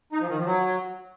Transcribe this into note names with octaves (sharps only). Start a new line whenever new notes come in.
D#4
F3
D#3
F3
F#3